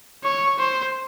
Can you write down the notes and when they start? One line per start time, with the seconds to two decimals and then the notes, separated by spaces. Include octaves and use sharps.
0.23 C#5
0.59 C5